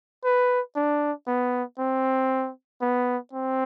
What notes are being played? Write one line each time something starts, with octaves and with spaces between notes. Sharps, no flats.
B4
D4
B3
C4
B3
C4